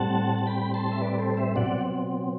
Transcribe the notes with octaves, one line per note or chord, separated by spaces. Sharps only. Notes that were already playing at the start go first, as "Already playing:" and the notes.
Already playing: A2 G3 C4 F#5 A5
A5
G5 B5
A5 C6
E5
B4 D5
A4 C5
C5 E5
B2 F#3 C4 D5 F#5